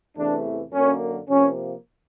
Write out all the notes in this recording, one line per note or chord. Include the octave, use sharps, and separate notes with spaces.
E2 C3 E3 A3 D4
F#2 D3 F#3 A#3 C#4
C3 F3 A#3 C#4